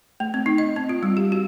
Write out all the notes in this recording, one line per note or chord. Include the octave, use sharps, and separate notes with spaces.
A3
C4
D#4
D#5
C4
F4
G3
G4
F#4